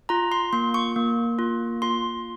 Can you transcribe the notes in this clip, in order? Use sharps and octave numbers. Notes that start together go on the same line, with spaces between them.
F4 A#5
C6
A#3 C6
C#6
A#3
F4
F4 C6